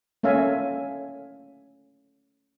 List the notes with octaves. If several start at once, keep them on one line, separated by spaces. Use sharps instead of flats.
A3 A#3 C#4 E5 F5 G#5